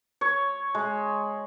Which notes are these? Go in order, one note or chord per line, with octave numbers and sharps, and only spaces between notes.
C#5
G#3